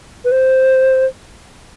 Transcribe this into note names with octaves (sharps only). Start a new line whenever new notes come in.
B4
C5